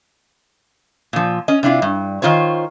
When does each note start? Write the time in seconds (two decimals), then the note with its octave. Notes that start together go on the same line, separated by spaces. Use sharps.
1.13 A#2 F3
1.48 C#4 D#5
1.63 C3 D4 E4 F4
1.82 G2
2.22 D#3 E3 F4 C5 C#5